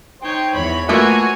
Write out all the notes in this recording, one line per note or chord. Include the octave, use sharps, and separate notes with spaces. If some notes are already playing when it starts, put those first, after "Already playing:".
D#4 C5 C#5 G5
E2 C#5 B5
A3 A#3 F4 F#4 B4 C#5 G#5